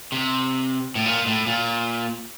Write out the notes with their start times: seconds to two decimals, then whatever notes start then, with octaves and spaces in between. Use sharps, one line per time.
0.12 C3
0.95 A2
1.06 A#2
1.27 A2
1.46 A#2